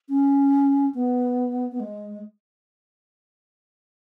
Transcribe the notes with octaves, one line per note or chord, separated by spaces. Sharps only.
C#4
B3
B3
G#3